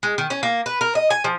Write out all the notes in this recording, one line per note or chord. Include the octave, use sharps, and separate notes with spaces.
G#3
D#3
C#4
A#3
B4
A#4
D#5
G#5
F3